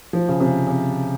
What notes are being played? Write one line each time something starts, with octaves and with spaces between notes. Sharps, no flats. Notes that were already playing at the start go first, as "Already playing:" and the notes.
F3
C#3
C3
C3